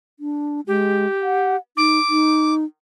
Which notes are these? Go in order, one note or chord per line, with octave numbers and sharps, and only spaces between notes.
D4
G#3 G4
F#5
D#4 D6
D#4